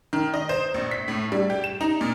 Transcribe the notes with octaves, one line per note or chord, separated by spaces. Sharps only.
D#3
D#5
C5
A#1
B6
A2
G3
G4
E7
D#4
A#2